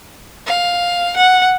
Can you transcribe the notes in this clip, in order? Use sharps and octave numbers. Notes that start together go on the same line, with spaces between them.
F5
F#5